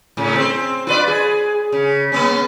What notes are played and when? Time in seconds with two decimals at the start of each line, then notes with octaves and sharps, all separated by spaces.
0.17 A2 C#3
0.36 C4 C5
0.87 F4 B4 D5
1.08 G#4
1.72 C#3
2.12 A#3 B3 C#4